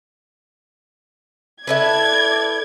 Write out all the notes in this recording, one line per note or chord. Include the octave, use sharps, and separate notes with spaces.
E4 A4 B4 D5 G#6